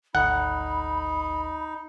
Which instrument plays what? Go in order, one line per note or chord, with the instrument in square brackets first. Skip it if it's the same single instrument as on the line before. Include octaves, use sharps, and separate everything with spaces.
[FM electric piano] G#1 D2 [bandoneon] D#4 [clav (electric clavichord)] F#5 [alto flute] B5